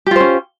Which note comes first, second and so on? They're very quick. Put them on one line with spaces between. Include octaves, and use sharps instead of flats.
G4 F4 C5 C#4